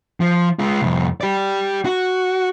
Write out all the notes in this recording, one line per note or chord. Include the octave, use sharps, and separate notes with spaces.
F3
G#3 F4
C2 F2
G4 D5
F#4